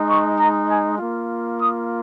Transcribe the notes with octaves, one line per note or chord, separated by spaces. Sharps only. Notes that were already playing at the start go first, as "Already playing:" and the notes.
Already playing: G#3 D#4
C#6
A#5
G#5
A#3 F4
D#6